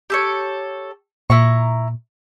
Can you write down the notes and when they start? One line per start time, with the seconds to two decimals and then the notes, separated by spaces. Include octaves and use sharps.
0.10 G4 A4 C#5
1.30 A#2 E4 A#5 C#6